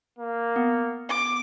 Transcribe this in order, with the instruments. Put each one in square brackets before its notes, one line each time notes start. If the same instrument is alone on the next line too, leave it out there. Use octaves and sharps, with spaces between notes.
[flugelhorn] A#3
[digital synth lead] B3
[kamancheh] D6